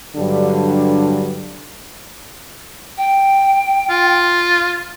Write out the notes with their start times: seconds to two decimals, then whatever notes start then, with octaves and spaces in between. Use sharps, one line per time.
0.16 G2 D3 F#3 G3 D4
2.98 G5
3.90 F4